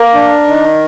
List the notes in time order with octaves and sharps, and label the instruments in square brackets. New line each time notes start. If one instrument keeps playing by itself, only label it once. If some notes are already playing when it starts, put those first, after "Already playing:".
Already playing: [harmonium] A#3 [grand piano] A#4
[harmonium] D4
D#3